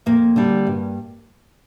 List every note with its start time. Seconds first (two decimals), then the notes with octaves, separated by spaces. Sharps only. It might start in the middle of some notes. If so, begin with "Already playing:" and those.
0.06 F2 A#3
0.36 D3 G3
0.67 G2